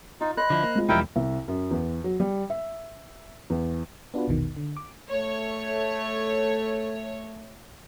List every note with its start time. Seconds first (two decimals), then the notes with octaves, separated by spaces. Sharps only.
0.21 D#4 F4
0.37 C5 D#5 B5 F#6
0.50 D3 F3 E4
0.63 A#3
0.75 G#3 F4
0.89 E1 F3 G3 D#4 E4 A#4 G5
1.16 C2
1.48 F#2
1.71 E2
2.04 F#3
2.20 G3
2.50 E5
3.50 E2
4.14 B3 D4 F4 F#4 B4
4.28 A#1 E2 B2 D#3
4.57 D3
4.77 D6
5.10 A3 C#5